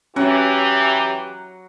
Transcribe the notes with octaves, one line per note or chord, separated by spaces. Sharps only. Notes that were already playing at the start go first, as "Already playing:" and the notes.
E3 F#3 C#4 G4 F#5